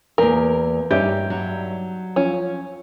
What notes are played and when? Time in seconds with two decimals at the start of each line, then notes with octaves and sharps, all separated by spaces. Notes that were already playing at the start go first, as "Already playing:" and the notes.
0.18 E2 A#3 A#4
0.91 G2 C#4 D#4 G4 E5 G6
1.30 F#3
2.16 F3 C#4